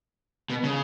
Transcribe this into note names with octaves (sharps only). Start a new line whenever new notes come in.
B2
C#3